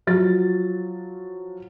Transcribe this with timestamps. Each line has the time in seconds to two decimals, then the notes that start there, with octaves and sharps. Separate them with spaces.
0.07 F3 F#3 A6